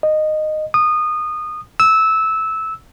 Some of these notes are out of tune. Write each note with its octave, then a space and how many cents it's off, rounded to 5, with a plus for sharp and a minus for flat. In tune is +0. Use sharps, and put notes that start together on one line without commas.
D#5 -15
D#6 -20
E6 -15